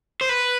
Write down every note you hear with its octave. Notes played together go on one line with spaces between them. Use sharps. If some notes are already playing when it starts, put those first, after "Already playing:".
C5
B4